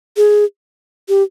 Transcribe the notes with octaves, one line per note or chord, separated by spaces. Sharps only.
G#4
G4